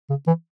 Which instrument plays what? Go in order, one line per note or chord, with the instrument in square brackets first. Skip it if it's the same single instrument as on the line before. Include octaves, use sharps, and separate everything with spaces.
[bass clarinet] C#3
E3